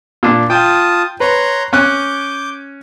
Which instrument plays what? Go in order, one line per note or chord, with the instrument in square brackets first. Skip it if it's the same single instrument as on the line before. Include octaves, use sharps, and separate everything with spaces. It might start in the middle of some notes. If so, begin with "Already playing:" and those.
[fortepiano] A#2 D4
[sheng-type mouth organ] F4 A5 D#6 [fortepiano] G5
[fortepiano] B4 [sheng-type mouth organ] C#5 A#5 C6
[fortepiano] C#4 G#5 F#6 [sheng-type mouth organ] D6 G6